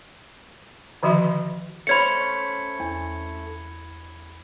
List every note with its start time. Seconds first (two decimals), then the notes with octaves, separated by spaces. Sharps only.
1.03 D3 D#3 F3 F#4 E5
1.87 A3 C#4 C5 B5 G#6 C#7
2.80 E2